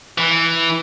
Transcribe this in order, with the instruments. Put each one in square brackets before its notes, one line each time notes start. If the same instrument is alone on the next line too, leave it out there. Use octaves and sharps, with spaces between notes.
[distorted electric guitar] E3